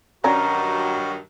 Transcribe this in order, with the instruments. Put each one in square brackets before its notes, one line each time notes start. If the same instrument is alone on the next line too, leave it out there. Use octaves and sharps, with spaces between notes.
[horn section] G2 D#3 F#3 [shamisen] C#4 D4 D5 [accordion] F#4 [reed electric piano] A#5